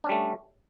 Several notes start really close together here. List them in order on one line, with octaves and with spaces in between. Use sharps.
D4 C#4 G3 A3